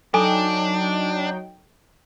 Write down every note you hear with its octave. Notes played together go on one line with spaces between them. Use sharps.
F#3 D4 D#4 A4 G5 G#5